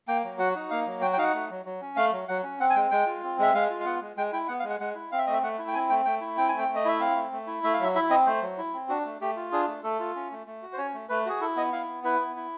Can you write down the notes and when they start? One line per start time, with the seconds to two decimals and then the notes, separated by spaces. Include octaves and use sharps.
0.08 A#3 G5
0.24 F#3
0.39 F#4 F#5
0.56 D#4
0.70 A#3 F5
0.86 F#3
1.02 F#4 G5
1.13 G5
1.18 D#4 F5
1.23 F#5
1.34 A3
1.50 F#3
1.65 F#3
1.82 C#4
1.96 A3 F5
2.12 F#3
2.28 F#3 F#5
2.43 C#4
2.60 C4 F#5
2.70 G#5
2.75 G#3 G5
2.91 G#3 G5
3.06 F4
3.23 C4
3.39 G#3 E5
3.54 G#3 F5
3.70 F4
3.80 F5
3.85 B3 F#5
4.02 G#3
4.17 G#3 G5
4.33 E4 G5
4.48 B3 F#5
4.60 F5
4.64 G#3
4.70 F#5
4.80 G#3 F#5
4.95 E4
5.12 C4 F5
5.18 E5
5.27 A3 D#5
5.33 E5
5.43 A3 F#5
5.59 E4
5.68 G5
5.74 C4 G#5
5.90 A3 G5
6.05 A3 G5
6.21 E4
6.37 C4 G5
6.48 A3 G#5
6.59 G5
6.69 A3
6.75 D#5
6.85 E4 E5
7.00 C4 F5
7.16 A3
7.32 A3
7.47 E4
7.63 A3 E5
7.74 F5
7.79 F#3 E5
7.95 E4 E5
8.10 C4 D#5
8.26 A3 C5
8.42 F#3
8.58 E4
8.74 C4
8.89 D4 F#4
9.05 A3
9.21 A3 G4
9.37 F4
9.52 D4 G#4
9.68 A3
9.83 A3 A4
9.99 F4
10.16 C#4
10.31 A3
10.47 A3
10.62 F#4
10.73 C5
10.78 C#4 C#5
10.94 A3
11.09 A3 B4
11.26 F#4 G#4
11.41 E4 A4
11.56 B3 D#5
11.73 E4 F5
11.88 B3
12.04 E4 B4
12.20 B3
12.36 E4